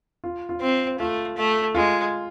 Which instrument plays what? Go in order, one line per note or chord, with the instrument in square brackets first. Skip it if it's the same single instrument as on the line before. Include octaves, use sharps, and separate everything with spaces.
[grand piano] F4
F4
[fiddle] C4
[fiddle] A3 [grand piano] F4
[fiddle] A3
[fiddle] G#3 [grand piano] F4